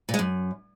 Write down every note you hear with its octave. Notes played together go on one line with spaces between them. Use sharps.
A#2
G#3
F#2